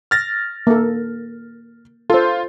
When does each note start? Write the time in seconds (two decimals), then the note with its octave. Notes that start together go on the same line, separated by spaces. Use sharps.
0.11 F6 A6 A#6
0.67 A#3 A4
2.10 F4 A4 C5